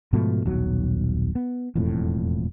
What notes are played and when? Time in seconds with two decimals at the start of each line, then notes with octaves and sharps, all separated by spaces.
0.13 G#2 B2 F3 A3
0.45 D#1 B1 F#3
1.35 B3
1.75 E1 F2 A2